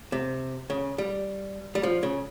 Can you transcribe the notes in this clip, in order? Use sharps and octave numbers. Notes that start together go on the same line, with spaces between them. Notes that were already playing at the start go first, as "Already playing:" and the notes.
C3
C#3
G3
G3
F3
C#3